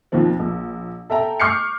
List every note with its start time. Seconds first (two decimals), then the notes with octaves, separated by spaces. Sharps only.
0.12 D#2 B2 D#3 F3 C4
0.40 A#1
1.10 A4 E5 G5 A#5
1.40 C#6 D6 F6 G6 C7 C#7